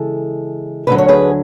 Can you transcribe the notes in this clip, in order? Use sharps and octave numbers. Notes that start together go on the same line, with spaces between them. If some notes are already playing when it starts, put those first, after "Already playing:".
Already playing: C#3 E3 G#3 A4
D2 D3 F#3 B4
C#5
G#4 B4